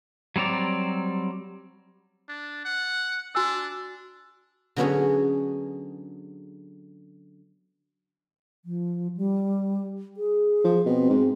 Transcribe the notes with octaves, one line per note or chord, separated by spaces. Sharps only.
F#3 G3 C4 D5 A#5
D4
F#5
D4 F#4 G#5 E6
D3 F#3 B3 C#4 F#4 G#4
F3
G3
G#4
F3
B2 C4
G#2